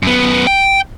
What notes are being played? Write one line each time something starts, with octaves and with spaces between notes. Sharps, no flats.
F#2 B3
G5